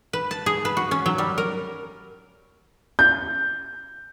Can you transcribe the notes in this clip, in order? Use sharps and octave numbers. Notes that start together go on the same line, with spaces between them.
B4
A5
G#4
B4
F#4
C#4
F#3
G3
A#4
G6